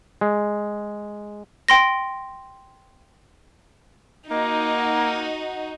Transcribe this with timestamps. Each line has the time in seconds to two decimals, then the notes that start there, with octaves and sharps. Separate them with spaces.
0.21 G#3
1.69 G5 C6 A#6
4.31 A#3 D#4 F#4